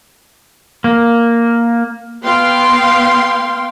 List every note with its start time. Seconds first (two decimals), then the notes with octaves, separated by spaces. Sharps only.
0.84 A#3
2.23 B3 F5 G5 C6